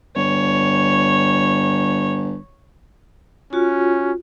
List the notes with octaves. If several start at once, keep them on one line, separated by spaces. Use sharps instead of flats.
G1 C#5
C#4 F4 F#4